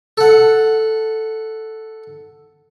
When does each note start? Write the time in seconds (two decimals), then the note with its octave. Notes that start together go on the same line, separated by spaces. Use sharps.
0.18 A4 F#5